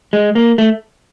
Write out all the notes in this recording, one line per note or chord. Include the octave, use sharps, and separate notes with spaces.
G#3
A#3
A3